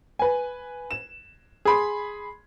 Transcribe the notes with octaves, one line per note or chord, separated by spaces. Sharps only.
B4 G#5
E7
G#4 B5 C6